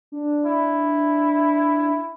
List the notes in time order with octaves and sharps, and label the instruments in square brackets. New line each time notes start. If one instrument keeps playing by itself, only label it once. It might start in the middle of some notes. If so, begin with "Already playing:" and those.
[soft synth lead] D4
[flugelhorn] E4